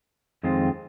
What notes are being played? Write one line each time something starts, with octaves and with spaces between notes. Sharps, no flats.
F2 D#3 G#3 C4 F4